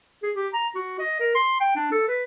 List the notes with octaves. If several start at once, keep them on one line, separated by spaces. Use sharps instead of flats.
G#4
G4
A#5
F#4
D#5
A#4
C6
G5
D4
A4
B4